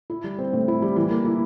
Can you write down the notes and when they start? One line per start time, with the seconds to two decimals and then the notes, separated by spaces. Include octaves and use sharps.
0.10 E4
0.24 G3
0.39 C4
0.53 A2
0.68 E4
0.82 G3
0.96 E3
1.10 A#3
1.25 E4